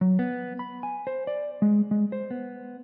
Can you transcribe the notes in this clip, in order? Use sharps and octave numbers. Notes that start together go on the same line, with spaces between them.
F#3
B3
B5
G#5
C5
D5
G#3
G#3
C5
B3